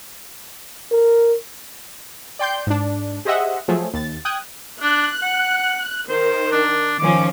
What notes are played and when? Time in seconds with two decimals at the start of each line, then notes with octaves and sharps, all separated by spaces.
0.91 A#4
2.39 D5 G5 C6 G6
2.67 G#2 D4
3.25 G4 G#4 C5 D#5 E5 F#5
3.68 F3 F#3 A3 G#4 A4
3.93 D#2 A6
4.25 G5 D#6 F#6 G#6
4.82 D4 F#6
5.22 F#5
6.09 D#3 C5
6.52 D4
6.99 D#3 F3 C#4 D6